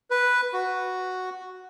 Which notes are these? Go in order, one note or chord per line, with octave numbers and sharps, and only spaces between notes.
B4
F#4